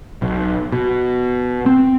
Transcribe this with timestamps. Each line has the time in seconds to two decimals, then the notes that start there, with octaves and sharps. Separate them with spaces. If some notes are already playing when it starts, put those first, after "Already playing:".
0.22 B1
0.72 B2
1.66 C4